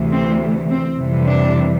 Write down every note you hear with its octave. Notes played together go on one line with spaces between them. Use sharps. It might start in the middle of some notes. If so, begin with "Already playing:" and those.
Already playing: D2 C3 E3
C4
C4
F2 C3 E3 G3
D4